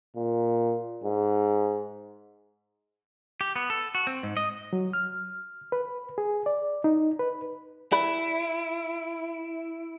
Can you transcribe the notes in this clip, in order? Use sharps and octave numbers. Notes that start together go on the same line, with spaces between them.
A#2
G#2
G4
B3
A4
F#4
C4
G#2
D#5
F#3
F6
B4
G#4
D5
D#4
B4
E4 B4 D5 B5